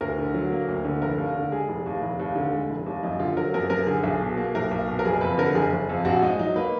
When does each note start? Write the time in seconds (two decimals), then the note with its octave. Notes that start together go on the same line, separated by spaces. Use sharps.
0.01 D2 A#4
0.18 D3
0.34 F#3
0.52 A#3
0.68 D2
0.85 D3
1.02 F1 A#4
1.18 D#2
1.35 D3
1.52 G#3 G#4
1.68 F1
1.86 D#2
2.02 F1
2.20 D#2
2.36 D3
2.53 G#3
2.70 F1
2.86 D#2
3.03 F#2 D#4
3.20 D3 F4
3.36 F#3 A#4
3.54 F#2 A#4
3.70 F#2 A#4
3.87 D3 G#4
4.03 B1 G#4
4.21 B2
4.37 A#3
4.55 B1 A#4
4.71 B1
4.88 B2
4.99 A#4
5.05 F#1 G#4
5.21 F2 B4
5.38 D3 A#4
5.55 F#1 G#4
5.72 F#1
5.89 F2
6.05 A#1 F#4
6.22 G#2 D#4
6.39 F#3 D#4
6.56 A#3 B4